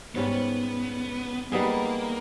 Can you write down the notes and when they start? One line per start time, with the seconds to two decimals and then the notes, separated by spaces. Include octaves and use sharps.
0.15 G#2 G3 B3 C#4
1.52 G3 A#3 B3 D#4 G#4